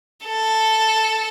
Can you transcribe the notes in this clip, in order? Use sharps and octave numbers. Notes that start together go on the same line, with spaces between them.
A4